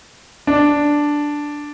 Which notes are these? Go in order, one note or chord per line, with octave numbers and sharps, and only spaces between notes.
D4